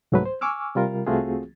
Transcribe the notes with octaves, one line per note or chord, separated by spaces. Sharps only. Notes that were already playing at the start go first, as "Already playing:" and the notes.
C2 G#2 F#3 A3 B4
C5
G#5 C#6 D6 E6 F6
C3 G3 F4 A#4
C2 A3 C4 F4 F#4 G#4